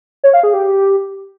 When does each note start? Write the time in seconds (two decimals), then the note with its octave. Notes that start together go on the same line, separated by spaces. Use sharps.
0.24 C#5
0.33 F5
0.43 G#4
0.53 G4